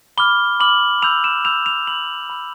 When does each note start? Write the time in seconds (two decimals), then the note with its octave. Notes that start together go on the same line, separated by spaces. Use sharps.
0.17 B5 D6 F6 G7
0.60 B5 D6 F6 F#7
1.02 B5 E6 G6 F7
1.24 E7
1.45 B5 E6 G6 F7
1.66 F7
1.87 B5 E6 G6 F#7
2.30 B5 E6 G6